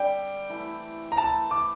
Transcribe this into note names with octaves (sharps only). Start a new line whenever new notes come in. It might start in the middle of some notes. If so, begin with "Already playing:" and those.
Already playing: D3 G3 C4 G4 G5
E3 A3 E4
A#5
E3 A3 E4 A5
D6